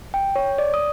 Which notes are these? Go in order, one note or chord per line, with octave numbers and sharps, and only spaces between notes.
G5
C#5
D5
D#6